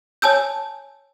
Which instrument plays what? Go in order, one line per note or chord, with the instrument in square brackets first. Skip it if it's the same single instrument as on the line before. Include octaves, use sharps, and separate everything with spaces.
[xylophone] C#5 G#5 A5 E6 G6